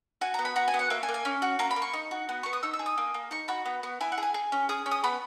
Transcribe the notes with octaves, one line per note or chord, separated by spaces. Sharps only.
F#4 G#5
B3 A#5
B5
F#4 A#5
G#5
B3
F#5
A#3 E5
G#5
A#3
G#5
C#4
F#4
A#3 A#5
B5
A#3
C#6
D#4
F#4
B3
B3 C#6
D#6
D#4 E6
E6
G#4
D#6
A#3
A#3
D#4 C#6
F#4 B5
B3
B3
E4 G#5
F#5
G#4 G#5
G#4
C#4
G#4 D#6
C#4
D#6
B3 B5